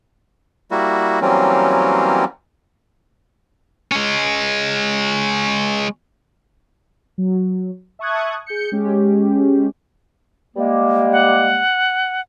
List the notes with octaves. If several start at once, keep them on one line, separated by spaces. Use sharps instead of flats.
G3 A#3 E4 F#4
E3 F#3 G3 A#3 C4 C#4
G#3 C#4
F#3
E5 A5 C#6 D#6 F#6 G#6
G#4 G6 C#7
G#3 C#4 G4
G3 G#3 A#3
F#5